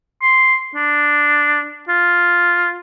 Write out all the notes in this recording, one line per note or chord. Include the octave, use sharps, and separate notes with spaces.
C6
D4
F4